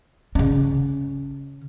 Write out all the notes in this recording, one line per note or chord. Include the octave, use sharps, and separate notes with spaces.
C#3 C#4